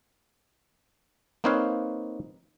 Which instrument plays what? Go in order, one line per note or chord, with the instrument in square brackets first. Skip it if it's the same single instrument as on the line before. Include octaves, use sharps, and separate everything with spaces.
[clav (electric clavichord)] A#3 C4 D#4 B4 C#5 F5